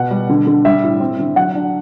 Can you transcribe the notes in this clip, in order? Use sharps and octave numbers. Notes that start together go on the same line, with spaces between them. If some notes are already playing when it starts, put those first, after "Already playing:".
Already playing: B2 F#5
G3
D3
D3
G3 E5
A2
C4
D3
F#3 F#5
D4